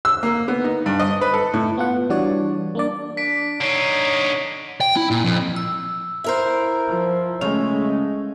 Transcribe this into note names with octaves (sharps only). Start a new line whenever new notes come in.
E6
A#3
B3
D#4
G2
D#5
B4
A4
A2
B3 F4 F#5
E3 G3 D4 F#4 C#5 D5
A#3 D4 D5
D4 B6 D7
D3 D#4 C#5 C7 D7
G5
E4
A#2
F2
E6
E4 A#4 C5
F3
C#3 G#3 A3 C#4